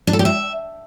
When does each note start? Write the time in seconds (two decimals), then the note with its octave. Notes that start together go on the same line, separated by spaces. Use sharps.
0.07 D4
0.13 A4
0.19 G4
0.25 E5